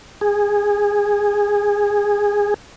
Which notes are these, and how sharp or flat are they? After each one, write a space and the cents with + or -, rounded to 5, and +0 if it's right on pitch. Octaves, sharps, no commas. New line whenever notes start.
G#4 -15